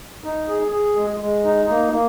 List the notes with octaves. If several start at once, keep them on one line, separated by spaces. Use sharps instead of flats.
D#4
G#4
G#4
G#3
G#3
D#4
A#3
A#3